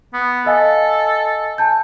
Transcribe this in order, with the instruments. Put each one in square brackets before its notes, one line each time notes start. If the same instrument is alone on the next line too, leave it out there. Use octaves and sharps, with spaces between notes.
[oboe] B3
[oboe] A4 [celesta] D#5 F5 G#5
[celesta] G#5 A5 G6